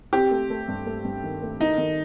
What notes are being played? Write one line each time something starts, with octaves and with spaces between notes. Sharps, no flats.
C4 G4
A3
A3
G2
A3
G2
D#3
A3
D#3 D#4
D#3